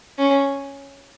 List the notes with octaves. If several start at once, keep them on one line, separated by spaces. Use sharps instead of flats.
C#4